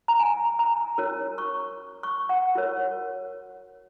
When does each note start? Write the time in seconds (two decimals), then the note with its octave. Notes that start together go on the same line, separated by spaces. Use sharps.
0.08 A#5
0.19 G#5
0.59 A#5
0.98 C#4 F#4 A#4 C#5
1.38 C#6
2.03 C#6
2.29 F#5
2.55 F#4 A#4 C#5